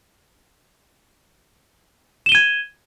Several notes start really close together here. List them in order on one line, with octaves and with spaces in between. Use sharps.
E7 G7 D#7 G#6